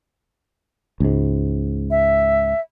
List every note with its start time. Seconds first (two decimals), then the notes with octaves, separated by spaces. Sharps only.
1.00 C#2 G#2
1.91 E5